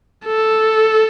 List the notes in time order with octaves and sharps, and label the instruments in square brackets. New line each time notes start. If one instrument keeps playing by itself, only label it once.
[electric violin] A4